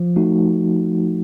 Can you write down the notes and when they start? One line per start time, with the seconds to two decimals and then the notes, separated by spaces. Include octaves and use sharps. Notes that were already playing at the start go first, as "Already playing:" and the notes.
Already playing: F3
0.16 A3 D#4 F#4